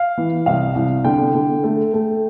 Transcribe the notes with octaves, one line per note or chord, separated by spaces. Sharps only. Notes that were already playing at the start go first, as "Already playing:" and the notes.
Already playing: F5
E3
C2 F5
C2
D3 G5
D3
A3
A3